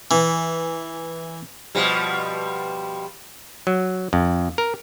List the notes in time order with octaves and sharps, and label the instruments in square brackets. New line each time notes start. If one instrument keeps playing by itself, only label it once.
[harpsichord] E3
[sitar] B2 F3 G3
[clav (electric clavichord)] F#3
F2
A#4